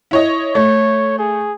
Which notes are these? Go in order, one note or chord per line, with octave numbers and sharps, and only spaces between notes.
E4 C#5 D#5
A3 C#5
G#4